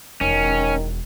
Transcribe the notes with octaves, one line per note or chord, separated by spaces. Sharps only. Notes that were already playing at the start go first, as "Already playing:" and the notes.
E1 D#3 C#4